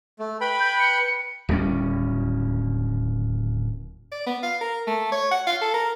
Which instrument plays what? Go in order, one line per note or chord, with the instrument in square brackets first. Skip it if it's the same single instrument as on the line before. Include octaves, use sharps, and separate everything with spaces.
[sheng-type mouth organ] A3
B4 G5 B5
[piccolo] G6
C#7
[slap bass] D1 D#2 G3 C#4
[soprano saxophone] D5
B3
F5
A#4
A3
C#5
F#5
F5
A4
A#4